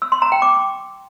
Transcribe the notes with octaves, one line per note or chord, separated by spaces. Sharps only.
E6
C6
A#5
G5
D6